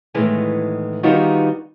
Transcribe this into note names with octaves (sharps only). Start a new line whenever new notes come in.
A2 D#3 E3 G#3 B3
D#3 G3 B3 D#4 F4 F#4